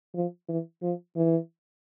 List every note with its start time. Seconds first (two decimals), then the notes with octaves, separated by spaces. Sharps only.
0.15 F3
0.49 E3
0.82 F3
1.16 E3